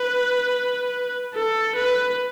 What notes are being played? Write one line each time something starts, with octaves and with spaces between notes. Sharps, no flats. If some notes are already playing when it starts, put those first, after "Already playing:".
Already playing: B4
A4
B4